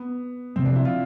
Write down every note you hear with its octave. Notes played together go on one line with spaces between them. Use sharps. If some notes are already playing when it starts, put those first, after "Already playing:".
Already playing: B3
C3 F3 G#3 C4
D4
E4
F4